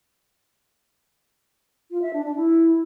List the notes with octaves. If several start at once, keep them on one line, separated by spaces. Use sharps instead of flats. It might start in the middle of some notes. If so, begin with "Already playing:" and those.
F4
E5
D4
D4
E4